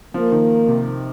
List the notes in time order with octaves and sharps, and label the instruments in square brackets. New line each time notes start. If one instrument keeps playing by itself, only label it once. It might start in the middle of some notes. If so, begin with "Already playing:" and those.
[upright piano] F3 [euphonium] A#3
[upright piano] D#3
C3